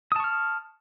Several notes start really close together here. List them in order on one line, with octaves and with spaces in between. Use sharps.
D#6 A5 C#6 F6